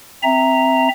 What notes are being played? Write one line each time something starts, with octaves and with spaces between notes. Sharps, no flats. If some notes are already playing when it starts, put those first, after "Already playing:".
C4 E5 A#5